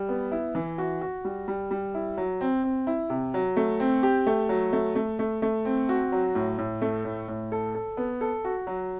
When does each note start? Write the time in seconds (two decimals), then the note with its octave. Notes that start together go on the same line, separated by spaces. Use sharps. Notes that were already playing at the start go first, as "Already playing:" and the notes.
Already playing: G3
0.09 B3
0.32 E4
0.55 E3
0.78 F#4
1.01 F#4
1.25 G3
1.48 G3
1.71 G3
1.94 E4
2.17 F#3
2.41 C4
2.64 C4
2.87 E4
3.10 C3
3.34 F#3
3.57 A3
3.80 C4
4.03 G4
4.27 A3
4.49 F#3
4.73 A3
4.95 A3
5.19 A3
5.42 A3
5.65 C4
5.89 F#4
6.12 F#3
6.35 A2
6.58 A2
6.82 A3
7.05 A2
7.28 A2
7.52 A4
7.75 A4
7.97 B3
8.21 A4
8.45 F#4
8.67 F#3